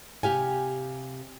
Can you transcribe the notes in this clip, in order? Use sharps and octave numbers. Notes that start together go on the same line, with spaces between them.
C3 G4 F5 G#5